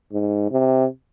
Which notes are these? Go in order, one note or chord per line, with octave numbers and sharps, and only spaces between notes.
G#2
C3